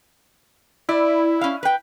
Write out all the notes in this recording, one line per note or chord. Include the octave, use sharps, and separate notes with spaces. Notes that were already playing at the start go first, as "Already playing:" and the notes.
E4 D5
C#4 F5
B4 G5